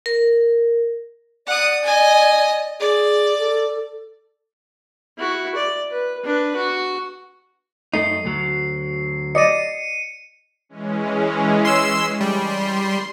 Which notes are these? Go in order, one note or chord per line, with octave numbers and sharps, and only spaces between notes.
A#4
D5 F#5 D#6
D#5 G#5
G#4 D5
A4
E4 F#4
D5
B4
D4 B4
F#4
F#2 A3 D#4 C7
D2 F#3
D5 D#5 C#7 D#7
E3 G#3 C#4
C6 E6
G3 C6